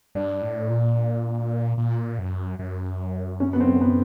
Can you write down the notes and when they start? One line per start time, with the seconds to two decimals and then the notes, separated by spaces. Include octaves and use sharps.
0.15 G2 D4
0.42 A2
0.69 A#2
1.77 A#2
2.18 F#2
2.59 F#2
3.40 C#4
3.53 B3
3.60 C4
3.81 B3